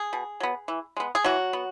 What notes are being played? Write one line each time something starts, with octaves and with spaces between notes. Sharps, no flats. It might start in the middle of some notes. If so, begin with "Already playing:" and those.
Already playing: G#4
B2
F#3 B3
E3
G#3 B3
G#4
E3 F#3 F#4
B3